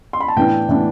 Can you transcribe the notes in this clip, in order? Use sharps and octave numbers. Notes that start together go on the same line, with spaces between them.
C6
B5
A5
A2 E3 B3 D4 G5
A2 E3 B3 D4